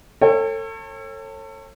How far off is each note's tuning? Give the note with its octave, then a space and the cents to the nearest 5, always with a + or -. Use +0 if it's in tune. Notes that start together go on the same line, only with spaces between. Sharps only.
A4 +30 C#5 -30 G5 +40